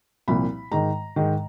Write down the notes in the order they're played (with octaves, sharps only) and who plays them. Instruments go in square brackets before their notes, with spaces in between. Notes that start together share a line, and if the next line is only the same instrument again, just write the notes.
[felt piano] C2 A#2 F3 B5
G#2 D#3 A#5
G#2 D#3